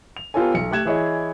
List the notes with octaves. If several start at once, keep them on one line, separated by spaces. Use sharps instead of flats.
F7
B3 F4 G4 A4 C#5 G#5
B1 C#7
A3 G4 F#6 G#6 E7
E3 E4 G#4 C#5 D#5